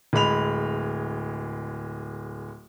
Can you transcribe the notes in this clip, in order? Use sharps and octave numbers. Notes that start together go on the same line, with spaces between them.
D1 G#3 B5 F7